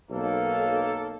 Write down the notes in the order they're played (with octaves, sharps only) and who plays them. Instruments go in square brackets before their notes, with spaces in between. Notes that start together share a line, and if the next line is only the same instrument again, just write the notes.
[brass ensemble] B1 A#3 A4